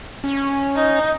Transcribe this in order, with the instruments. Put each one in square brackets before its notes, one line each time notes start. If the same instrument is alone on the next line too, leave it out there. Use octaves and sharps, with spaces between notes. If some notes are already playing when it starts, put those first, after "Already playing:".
[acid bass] C#4
[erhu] D#4